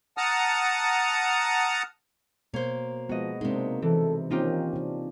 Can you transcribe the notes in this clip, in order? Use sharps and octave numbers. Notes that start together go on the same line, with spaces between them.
F#5 A5 A#5 D#6 F6
B2 A#3 C5 C#5
F3 G#3 B3 F#4 D#5
C3 G#3 A#3 C4 D4 D#4
E3 A4
D#3 A#3 C4 C#4 D#4 F4 G4
C3 D4